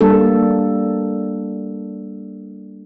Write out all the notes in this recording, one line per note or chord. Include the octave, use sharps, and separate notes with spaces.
G3 A#3 D4 A4